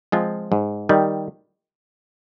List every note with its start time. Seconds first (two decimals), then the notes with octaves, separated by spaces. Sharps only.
0.12 F3 G#3 C4 F4
0.52 G#2
0.89 D#3 G3